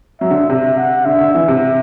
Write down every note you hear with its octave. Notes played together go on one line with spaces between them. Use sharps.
F#3 E5
D3
C3 E5
F#5
D3 E5
D3
E3 E5
C3